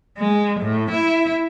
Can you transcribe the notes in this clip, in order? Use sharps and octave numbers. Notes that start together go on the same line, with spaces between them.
G#3
A2
E4